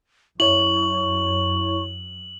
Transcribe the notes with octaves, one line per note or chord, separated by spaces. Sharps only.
F#2 E4 C#5 C#6 F#7